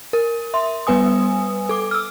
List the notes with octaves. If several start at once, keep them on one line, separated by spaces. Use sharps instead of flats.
A#4
E5 C6
G3 B3 B4 G#5 D#6
A4 D6
E6 F6